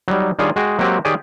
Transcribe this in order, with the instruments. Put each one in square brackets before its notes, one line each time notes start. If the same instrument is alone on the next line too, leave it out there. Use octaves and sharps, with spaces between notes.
[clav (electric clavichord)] F#3 G3 D#4
D#3 G3 D4 F4 G#4 C#5
G#3 F#4 G#4 G5
F#3 G#3 A#3 C4 F#4 G4
D#3 G4 G#4 C#5 D5 G#5